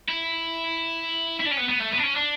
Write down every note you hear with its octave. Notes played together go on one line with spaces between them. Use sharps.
E4
E4
D4
C#4
B3
B3
A3
B3
D4
C#4
D4